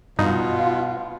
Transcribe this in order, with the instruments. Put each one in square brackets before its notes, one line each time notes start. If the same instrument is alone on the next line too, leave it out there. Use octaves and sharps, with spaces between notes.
[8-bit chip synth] G2 [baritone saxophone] B2 [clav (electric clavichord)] D#4 [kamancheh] F4